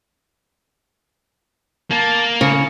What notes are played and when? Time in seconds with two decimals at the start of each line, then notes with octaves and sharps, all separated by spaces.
1.91 A#3 A5
2.41 C#3 C#6